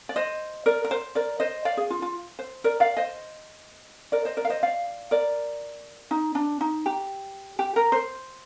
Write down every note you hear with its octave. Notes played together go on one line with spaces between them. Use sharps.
D5
C5 D#5
A#4 D5
A#4
C5
A#4 D5
C5 D#5
D5 F5
G#4
F4
F4
C5
A#4 D5
D5 F5
C5 D#5
A#4 D5
C5 D#5
A#4 D5
F5
C5 D#5
D5 F5
A#4 D5
D#4
D4
D#4
G4
G4
A#4
C5